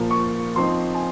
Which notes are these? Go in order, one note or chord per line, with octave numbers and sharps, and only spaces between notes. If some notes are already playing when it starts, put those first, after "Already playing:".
Already playing: A#2 F3 A#3
C#6
F3 C4 D#4 C6
G#5